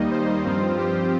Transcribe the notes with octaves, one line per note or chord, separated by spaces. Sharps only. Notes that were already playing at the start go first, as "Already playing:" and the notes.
Already playing: D#2 D#3 G3 A#3 D#4 D#5
C5
G2 F3 C4 F4
G4